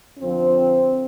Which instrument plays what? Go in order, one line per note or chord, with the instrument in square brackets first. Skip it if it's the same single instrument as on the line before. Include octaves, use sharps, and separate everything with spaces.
[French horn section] F2 D3 F3 C4